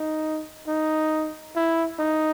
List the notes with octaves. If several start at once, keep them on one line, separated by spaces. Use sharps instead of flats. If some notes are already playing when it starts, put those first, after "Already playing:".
Already playing: D#4
D#4
E4
D#4